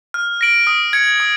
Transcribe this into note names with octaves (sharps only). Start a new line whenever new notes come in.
F6
A#6 D7 F#7
D#6
G#6 C#7
D#6